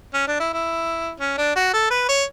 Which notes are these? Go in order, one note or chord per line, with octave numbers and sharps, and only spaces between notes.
C#4
D4
E4
E4
C#4
D4
F#4
A4
B4
C#5